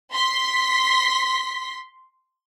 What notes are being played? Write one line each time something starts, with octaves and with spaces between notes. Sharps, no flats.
C6 B6